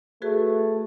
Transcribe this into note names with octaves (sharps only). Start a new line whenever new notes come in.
A3 F#4 G#4 B4